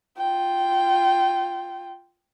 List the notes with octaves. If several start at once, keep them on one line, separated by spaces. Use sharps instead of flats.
F4 G5